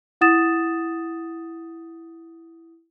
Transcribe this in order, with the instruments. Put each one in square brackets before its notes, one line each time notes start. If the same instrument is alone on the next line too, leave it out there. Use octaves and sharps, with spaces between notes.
[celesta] E4 F#5 D#6 A6 E7